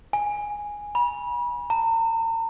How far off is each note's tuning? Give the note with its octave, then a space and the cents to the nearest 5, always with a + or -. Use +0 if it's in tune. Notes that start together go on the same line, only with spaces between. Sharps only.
G#5 -5
B5 -35
A#5 -45